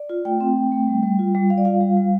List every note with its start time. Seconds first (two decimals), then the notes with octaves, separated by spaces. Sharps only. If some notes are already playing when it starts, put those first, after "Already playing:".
Already playing: D5
0.09 F4
0.25 A3 G5
0.40 C4
0.56 C4
0.72 A3
0.88 G3
1.03 G3
1.19 F4
1.35 G3
1.50 G3 F5
1.58 D5
1.65 F4 F5
1.81 G3
1.97 G3